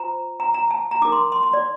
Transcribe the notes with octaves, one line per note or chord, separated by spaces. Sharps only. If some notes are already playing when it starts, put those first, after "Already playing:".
Already playing: F4 C5 A#5
A#5
A#5
A5
A#5
D#4 A#4 D6
C6
C6
C6
D5